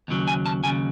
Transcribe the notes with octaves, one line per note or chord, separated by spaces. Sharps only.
D#2 C#3 F#3
G#5
A5
D#2 C#3 F#3 G#5